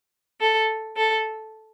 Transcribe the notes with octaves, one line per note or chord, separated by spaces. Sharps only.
A4
A4